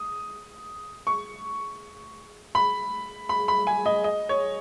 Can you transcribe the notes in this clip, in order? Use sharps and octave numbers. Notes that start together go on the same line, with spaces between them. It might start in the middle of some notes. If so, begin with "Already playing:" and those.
Already playing: D#6
C#6
B5
B5
B5
G#5
D#5
D#5
C#5